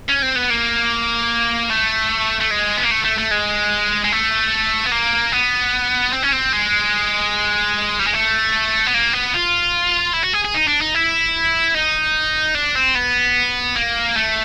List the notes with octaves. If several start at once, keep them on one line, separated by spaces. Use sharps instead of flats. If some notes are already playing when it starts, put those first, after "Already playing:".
C#4
C4
B3
A#3
A3
A3
G#3
B3
A#3
A3
A3
A3
G#3
G#3
A3
B3
A#3
B3
C4
C#4
C4
G#3
G3
G#3
A3
B3
A#3
B3
F4
E4
F#4
G#4
G#4
D#4
D4
D#4
E4
D#4
D4
C4
B3
A#3
A3